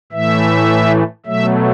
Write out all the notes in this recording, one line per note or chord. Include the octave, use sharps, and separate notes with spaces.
A2 E3 A3 E5
B2 F#3 A3 E5